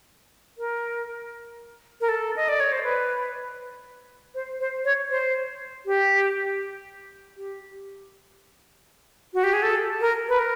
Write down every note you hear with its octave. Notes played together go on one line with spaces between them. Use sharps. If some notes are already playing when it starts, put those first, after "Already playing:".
A#4
A#4
A4
D#5
D5
C#5
C5
B4
C5
C5
C#5
C5
G4
G4
F#4
G4
G#4
A4
A#4
B4
A#4